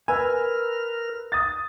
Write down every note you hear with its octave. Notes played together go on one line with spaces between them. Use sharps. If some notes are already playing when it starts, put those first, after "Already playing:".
A#4 B4 G#5 E6 F6
D#6 A6